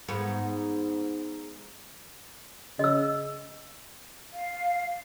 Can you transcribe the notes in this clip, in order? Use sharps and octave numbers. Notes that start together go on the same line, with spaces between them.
G#2 B3
C#3 D#5 E6
F5